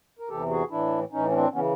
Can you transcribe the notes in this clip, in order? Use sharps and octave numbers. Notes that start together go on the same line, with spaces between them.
A#4
E2 C3 E3 G4 A4
F#4 G#4
A2 E3 D4 E4
A2 E3 C#4 D#4
C#4
C4 D4
C#3 E3 B3 C#4